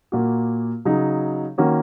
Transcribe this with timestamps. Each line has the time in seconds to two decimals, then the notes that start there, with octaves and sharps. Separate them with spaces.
0.12 A#2 A#3 F#4
0.85 C#3 F#3 D#4
1.58 D#3 A#3 C#4 F#4